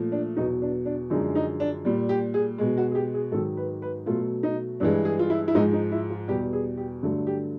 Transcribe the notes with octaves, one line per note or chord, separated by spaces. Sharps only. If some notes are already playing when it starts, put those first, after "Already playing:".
Already playing: A#2 F3 A3
D4
E2 B2 F#3 D#4
D4
D4
F#2 D3 F3 G#3 D#4
D#4
D4
A#2 G3
G4
G#4
B2 G#3
F#4
G#4
G4
G#4
G#2 D#3 F#3 A4
B4
B4
B2 F#3 A3 F4
D#4
G2 E3 G#3 D4
G#4
F4
E4
E4
G#2 F3 G#3 D#4
D#4
E4
F4
E2 B2 G3 G4
G#4
G4
G2 D3 F#3 A3
G4